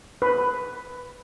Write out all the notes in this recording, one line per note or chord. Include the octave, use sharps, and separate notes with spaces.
B4